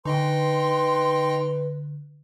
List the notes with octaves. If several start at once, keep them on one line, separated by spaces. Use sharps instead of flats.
D3 D#4 B4 D#5 G5 C6